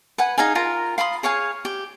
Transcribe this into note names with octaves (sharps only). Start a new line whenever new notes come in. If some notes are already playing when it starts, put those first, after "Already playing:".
B4 F#5 G#5
D#4 G#4 F5 G#5
F4 A#4 A#5
F5 B5 C6 D#6
G#4 C#5 F5 G#5
G4